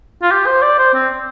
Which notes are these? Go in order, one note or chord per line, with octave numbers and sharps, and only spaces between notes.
F4
G4
C5
D5
C5
C4